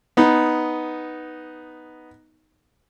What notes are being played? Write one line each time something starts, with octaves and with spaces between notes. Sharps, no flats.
B3 D#4